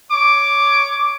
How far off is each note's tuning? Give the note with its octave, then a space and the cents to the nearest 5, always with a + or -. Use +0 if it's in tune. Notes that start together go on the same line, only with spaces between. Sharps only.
C#5 +10 D6 +0